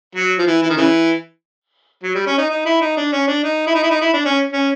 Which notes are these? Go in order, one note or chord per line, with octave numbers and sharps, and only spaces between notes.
F#3
F3
E3
E3
D#3
C#3 E3
F#3
G3
C#4
D#4
D#4
E4
D#4
D4
C#4
D4
D#4
E4
D#4
E4
D#4
E4
D4
C#4
C#4